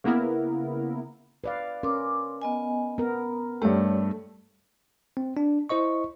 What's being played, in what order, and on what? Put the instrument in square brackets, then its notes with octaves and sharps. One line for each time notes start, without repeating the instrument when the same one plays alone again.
[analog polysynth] C#3 A#3 B3 E4 A#4
[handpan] B4 D5 F5
[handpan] C#4 A#4 [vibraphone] C6 D6
[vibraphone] B3 D#5 G#5
[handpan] B3 A#4 [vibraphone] A#5
[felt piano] G2 A3 [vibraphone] G4 C#5 D5
[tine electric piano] C4
D4
E4 C5 D#5 C#6